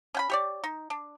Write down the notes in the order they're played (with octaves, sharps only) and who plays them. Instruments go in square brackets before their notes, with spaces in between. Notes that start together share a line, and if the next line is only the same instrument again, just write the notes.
[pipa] C#4 G5 B5
G4 C#5 D5
D#4
D4